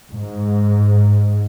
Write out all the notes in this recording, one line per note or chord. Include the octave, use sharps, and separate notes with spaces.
G#2